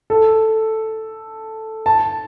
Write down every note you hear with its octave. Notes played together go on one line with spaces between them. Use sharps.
A4
A5